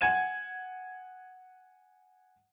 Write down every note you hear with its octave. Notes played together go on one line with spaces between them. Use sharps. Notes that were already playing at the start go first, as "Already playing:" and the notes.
F#5 G#5 G#6 D#7 E7